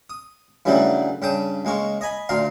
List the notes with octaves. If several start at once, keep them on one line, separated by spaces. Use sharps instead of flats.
D#6
G2 C#3 E3 F#3 G3 A3
G2 C#3 G5 A5 D#6
C#2 G#3 A#3 C#6
D#5 G#5 B5
D2 A#2 F5 A#5 C6